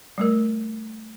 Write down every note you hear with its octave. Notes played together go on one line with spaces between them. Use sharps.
G3 A3 A#4